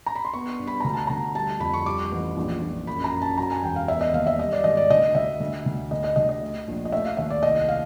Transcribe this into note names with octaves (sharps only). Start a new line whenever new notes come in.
A#5
B5
C6
B3 C#6
G2
B5
D2 A#5
A5
D2 A#5
G3 A5
F2 B5
C#6
G3 D6
A1
A#1
A#1
F#2 B5
A#5
F#2
A5
F#3 A#5
G#5
E1 G5
F5
B3 E5
D#5
D#2 F5
E5
G3 D#5
D5
G#1 D#5
D5
D2 D#5
D2 E5
D2
D2
D2 D#5
D#5
D2 D#5
D#5
A3
A#1
D#5
A3 E5
F5
D#2 E5
D5
C2 D#5
F5